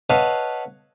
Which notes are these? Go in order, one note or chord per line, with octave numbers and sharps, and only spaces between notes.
A4 B4 C#5 D#5 F5 F#5